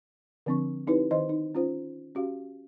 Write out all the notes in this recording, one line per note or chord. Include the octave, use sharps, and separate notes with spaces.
D3 F3 C4 D4 C#6
C4 D#4 E4 G4 B4 C#5
D#3 C5 D#5 C6
D#4
C#4 F4 C5
C#4 F#4 G4 F5